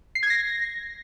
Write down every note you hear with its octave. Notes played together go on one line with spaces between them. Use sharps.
C7
G#6
A#6